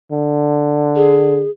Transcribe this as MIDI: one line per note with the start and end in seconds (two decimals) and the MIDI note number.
0.12 1.44 50
0.96 1.50 68